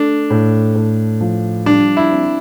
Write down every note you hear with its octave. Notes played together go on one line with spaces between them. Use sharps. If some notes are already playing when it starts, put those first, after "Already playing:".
Already playing: A3 D4
A2
A2
F3
G3 D4
E4
C4